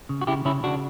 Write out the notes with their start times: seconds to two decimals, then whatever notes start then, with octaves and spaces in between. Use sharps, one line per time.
0.09 C#3
0.21 F#4
0.27 C#3 E4 G4
0.45 C#3 C#4 E4
0.63 C#3 D4 F#4